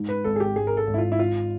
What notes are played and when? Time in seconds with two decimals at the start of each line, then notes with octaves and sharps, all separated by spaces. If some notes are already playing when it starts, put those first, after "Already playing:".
Already playing: G#2
0.09 B4
0.24 G#1 A4
0.36 G#4
0.40 G4
0.55 G#1 G#4
0.67 A#4
0.77 A4
0.87 G#1
0.94 E4
0.98 F4
1.12 E4
1.19 D#4 F4